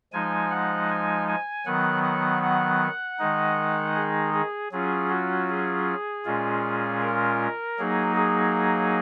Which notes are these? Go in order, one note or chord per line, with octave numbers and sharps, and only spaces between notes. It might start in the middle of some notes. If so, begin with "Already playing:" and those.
F3 G#3 D#4 G#5
F#5
G#5
G#5
D#3 F#3 B3 F#5
F#5
F#5
D#3 G#3 D#4
G#4
G#4
F#3 C#4 F4 G#4
F#4
G#4
A#2 G#3 C#4 F4
A#4
F#3 A#3 D#4 G#4
G#4